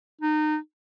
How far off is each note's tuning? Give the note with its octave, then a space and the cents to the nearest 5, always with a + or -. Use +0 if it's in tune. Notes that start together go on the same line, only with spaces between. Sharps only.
D#4 -25